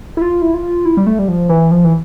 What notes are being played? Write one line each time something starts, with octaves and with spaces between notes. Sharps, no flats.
E4
F4
E4
F4
E4
G3
A3
G3
F3
E3
F3
E3